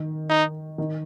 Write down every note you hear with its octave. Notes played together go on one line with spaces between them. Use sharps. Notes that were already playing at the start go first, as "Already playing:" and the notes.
Already playing: D#3
D#4
D#3